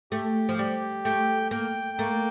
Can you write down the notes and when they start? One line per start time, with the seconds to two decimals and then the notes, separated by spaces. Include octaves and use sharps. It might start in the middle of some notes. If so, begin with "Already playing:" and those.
0.11 A3 G4
0.49 F3
0.58 G3 G4
1.05 A3 G5
1.51 A#3 G5
1.98 A3 A#3